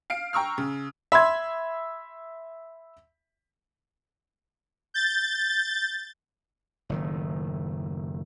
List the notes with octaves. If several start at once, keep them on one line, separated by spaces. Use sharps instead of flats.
F5 C7 D7
G5 A#5 C#6 E6 F6
C#3
E5 B5 C6 G#6
G6 A6
F#1 A2 D#3